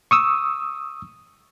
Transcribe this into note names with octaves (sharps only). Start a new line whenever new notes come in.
C#6 D#6 E6